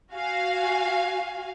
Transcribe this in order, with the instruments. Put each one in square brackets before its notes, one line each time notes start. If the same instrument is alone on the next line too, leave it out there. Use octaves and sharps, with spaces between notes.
[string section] F#4 F5 G#5